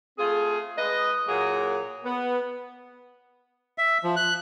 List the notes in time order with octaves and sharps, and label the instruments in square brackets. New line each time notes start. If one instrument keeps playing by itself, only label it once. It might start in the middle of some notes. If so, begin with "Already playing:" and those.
[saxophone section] A3 C4 F4 G#4
G#3 B4 D#5
A#2 F#3 A#3 G#4
B3
[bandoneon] E5
F3
F#6